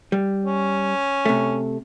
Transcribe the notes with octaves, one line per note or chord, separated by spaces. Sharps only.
G3
C#4
C3 A3